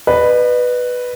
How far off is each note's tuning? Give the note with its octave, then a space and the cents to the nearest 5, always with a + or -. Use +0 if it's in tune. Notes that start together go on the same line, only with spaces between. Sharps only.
B4 +0 D#5 -45